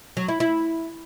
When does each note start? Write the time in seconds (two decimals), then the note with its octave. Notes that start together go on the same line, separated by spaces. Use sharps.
0.17 F#3
0.28 E4
0.40 E4